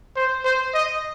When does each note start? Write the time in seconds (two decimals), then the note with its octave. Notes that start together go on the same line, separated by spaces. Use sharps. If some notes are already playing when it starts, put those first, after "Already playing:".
0.16 C5
0.45 C5
0.74 D#5